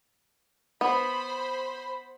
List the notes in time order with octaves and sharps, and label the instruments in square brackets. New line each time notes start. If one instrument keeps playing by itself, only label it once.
[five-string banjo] B3 [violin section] C5 B5